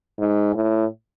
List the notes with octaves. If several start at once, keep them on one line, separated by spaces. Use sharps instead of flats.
G#2
A2